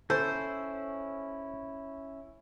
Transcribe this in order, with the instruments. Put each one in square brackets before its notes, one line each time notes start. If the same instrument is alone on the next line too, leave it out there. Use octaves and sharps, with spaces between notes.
[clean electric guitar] C#4 E4 [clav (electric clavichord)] A4 [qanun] C5